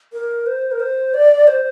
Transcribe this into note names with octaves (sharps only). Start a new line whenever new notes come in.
A#4
C5
A#4
C5
D5
C5